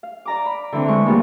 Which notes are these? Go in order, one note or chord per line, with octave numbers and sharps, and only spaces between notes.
F5
D5 A#5 D6
B5
D3 E3 C4
G#3 C#6
E3 F3 G3 G#3 A#3 B3